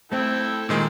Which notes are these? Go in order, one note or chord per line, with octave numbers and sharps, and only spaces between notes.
A3 C4 E4 A4 G5
A#2 D#3 G#3 C5